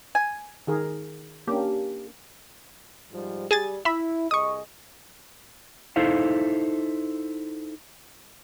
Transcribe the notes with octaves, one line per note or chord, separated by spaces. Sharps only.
G#5
D#3 G#4 A#4
A#3 C#4 D4 G4
G#2 F3 G3
G3 G#4 G#5 A6
E4 E5 B5
C2 G#4 D#5 C#6 D#6
D#4 E4 A4 C5 F5